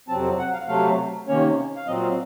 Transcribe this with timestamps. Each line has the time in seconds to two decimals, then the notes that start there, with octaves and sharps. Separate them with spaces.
0.08 F2 C3 F#3 C4 A5
0.39 F#5
0.53 F5
0.68 C3 F#3 A3 F5
1.28 C3 D#3 A#3 C#4 C#5
1.76 F5
1.87 A#2 F#3 C4 D#5
2.02 F5